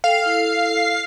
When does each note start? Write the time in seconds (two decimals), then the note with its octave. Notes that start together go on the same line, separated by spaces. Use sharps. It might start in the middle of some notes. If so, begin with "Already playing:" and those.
0.04 A4 F5 G5
0.26 E4 A4